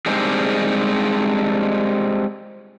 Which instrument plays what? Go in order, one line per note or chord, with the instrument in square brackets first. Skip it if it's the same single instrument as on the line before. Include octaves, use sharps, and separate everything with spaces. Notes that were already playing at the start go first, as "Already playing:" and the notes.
[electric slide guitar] G3 G#3 C4 D4 D#4 G#4